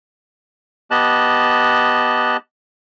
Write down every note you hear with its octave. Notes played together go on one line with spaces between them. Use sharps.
B3 G4 D#5 A5 F#6